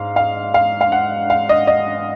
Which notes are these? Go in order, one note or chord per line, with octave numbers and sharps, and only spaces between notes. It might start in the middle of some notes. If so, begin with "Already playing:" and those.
Already playing: G#2 F5
F5
F5
F5
F#5
F5
D#5
D#5